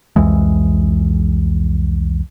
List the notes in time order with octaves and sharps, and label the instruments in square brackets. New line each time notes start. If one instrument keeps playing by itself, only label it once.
[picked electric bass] C2 F2 E3 G#3